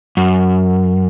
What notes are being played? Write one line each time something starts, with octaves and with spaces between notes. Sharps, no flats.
F#2